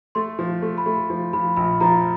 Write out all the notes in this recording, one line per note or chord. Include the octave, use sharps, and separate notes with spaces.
A3 C6
F3
A3
B5
A3
F3
F3 B5
A#1 B5
F3 A#5